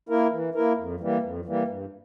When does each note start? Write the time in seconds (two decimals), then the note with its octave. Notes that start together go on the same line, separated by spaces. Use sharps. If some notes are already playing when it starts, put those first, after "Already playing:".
0.09 A#3 E4 A#4
0.32 E3
0.55 A#3 E4 A#4
0.77 F2
1.00 E3 G3 A#3
1.23 F2
1.45 E3 G3 A#3
1.67 G2